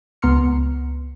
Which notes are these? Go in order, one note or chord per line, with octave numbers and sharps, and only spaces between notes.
C#2 B3 A#5 C6 F6 C#7